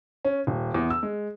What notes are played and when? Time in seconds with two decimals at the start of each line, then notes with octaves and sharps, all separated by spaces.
0.25 C#4
0.47 D#1
0.74 E2
0.90 E6
1.03 G#3